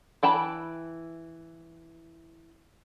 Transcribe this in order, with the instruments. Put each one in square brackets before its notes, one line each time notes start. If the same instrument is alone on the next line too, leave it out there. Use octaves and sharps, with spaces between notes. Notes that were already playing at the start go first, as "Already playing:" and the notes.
[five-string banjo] E3 G5 A5 B5